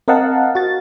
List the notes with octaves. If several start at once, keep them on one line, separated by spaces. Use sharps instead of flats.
C4 A#4 D#5 F5 F#5 A5
F#4 A6